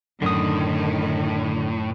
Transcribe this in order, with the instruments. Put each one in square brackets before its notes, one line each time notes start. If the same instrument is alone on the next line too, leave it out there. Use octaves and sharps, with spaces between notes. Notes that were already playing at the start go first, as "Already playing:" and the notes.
[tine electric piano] F#2 [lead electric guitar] A2 [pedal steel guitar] D3 D#6 [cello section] D#3